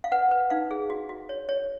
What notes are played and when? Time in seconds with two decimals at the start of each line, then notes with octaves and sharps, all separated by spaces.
0.04 F5
0.12 B4 F#5
0.31 B4
0.50 D#4 F5
0.71 G#4
0.90 F#4
1.09 F#4
1.29 C#5
1.49 C#5